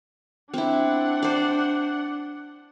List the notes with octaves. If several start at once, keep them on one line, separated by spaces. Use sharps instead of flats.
C4 D4 E4 F#5
C5 D5